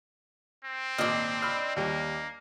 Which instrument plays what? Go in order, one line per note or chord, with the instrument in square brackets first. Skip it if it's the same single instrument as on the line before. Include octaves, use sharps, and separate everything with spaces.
[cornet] C4
[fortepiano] G#1 A#2 F6 [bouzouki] D4 D#5
[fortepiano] B5 E6 F6
[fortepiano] D#2 G3 [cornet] A#3